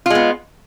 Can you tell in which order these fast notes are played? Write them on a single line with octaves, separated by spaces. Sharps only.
F4 G#3 B3